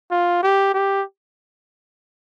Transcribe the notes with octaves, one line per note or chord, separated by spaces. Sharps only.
F4
G4
G4